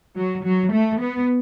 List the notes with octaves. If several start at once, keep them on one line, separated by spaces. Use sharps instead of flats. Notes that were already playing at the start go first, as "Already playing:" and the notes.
F#3
F#3
A3
B3